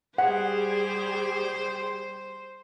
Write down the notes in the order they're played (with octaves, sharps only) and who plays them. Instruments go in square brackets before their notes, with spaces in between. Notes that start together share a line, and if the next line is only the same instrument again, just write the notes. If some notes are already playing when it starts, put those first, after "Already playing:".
[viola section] G3 G4 G#4 [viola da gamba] C5 [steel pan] F#5